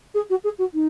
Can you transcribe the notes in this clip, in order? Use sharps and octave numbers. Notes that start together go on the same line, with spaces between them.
G#4
F#4
G#4
F#4
D#4